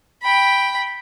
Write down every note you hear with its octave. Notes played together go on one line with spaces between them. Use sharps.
G5 B5